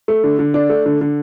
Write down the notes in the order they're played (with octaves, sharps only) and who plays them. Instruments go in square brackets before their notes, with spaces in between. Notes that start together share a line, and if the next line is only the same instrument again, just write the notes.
[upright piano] A3
D3
D3
D4
A3
D3
D3